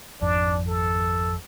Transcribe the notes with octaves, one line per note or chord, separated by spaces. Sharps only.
G#1 F2 D4
A4